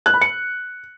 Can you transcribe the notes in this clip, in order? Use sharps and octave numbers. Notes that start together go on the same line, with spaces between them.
F#6
B5
C#7